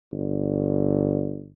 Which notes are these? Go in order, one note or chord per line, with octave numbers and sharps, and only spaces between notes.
G1